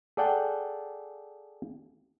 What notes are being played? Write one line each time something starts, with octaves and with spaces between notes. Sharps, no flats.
G#4 A4 D5 F#5 G5 A5